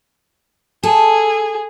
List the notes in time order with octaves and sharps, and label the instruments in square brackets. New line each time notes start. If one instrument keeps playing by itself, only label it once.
[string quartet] G#4 [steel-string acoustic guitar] A4